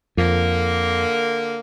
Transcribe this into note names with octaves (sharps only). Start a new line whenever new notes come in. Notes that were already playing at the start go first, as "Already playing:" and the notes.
F2 D3 A#3